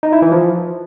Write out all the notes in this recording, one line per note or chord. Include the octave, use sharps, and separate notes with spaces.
D#4
E4
E3
F3